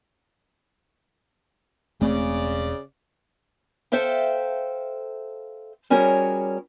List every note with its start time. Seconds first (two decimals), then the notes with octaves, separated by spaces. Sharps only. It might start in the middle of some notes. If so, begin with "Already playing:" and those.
2.01 E1 C#3 A3 C4 D5
3.92 A4 C5 E5 F5 G5
5.90 G3 C#4 F#4 G#4 A#4 C#5